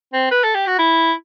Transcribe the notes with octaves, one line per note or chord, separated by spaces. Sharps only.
C4
B4
A4
G4
F#4
E4